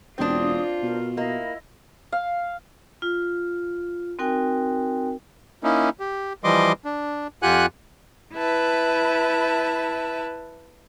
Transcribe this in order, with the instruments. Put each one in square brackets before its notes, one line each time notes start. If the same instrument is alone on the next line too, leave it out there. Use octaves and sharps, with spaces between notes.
[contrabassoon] E1 [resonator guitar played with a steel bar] C4 D4 [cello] F4 [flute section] C#5 D#6
[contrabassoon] B2 [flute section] A#4
[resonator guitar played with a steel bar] A#3 [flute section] E4 D#5
[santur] F5
[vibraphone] F4
C4 D#4 F#4 A#4 G5 G#5
[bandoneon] A#3 C#4 D#4 E4
G4
E3 F3 G3 D#5 C6 D6
D4
F2 F4 G4 F#5 G#5 F#6
[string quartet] E4 B4 E5 A5